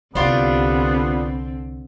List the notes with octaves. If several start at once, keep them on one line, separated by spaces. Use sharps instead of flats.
C2 D3 B3 C4 D4 F4 G4